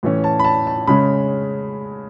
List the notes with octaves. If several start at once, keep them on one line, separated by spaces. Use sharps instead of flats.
A2 E3 A3 C#4
A5
B5
A5
A5
C#3 G#3 C#4 B5